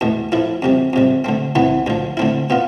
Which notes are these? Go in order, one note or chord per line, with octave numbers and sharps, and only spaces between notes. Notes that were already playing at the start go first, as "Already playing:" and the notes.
E2 B2 A3
A2 F3 A3 E4
F2 C3 G3
F2 C3 G3
D3 A3 C4
C2 C3 E3 B3
D2 D3 F3
D3 A3 C4 E4
B2 B3 F4